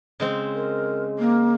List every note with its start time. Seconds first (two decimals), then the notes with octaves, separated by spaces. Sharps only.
0.20 C#3 G#3 C4
0.55 A#4
1.19 A#3